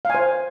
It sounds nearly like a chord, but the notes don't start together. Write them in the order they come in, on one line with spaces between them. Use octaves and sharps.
F5 G#5 C5